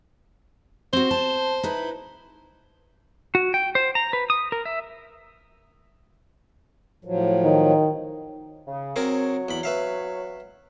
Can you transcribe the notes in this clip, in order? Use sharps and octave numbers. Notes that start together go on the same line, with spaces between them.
C4 F#4 C5
A5
D#4 E4 B4
F#4
G5
C5
A#5
B4
D#6
A#4
E5
A2 F3 F#3
D#3
C#3
F#3 C4 G#4 A#4 C#5
E2 B5
B4 E5 F5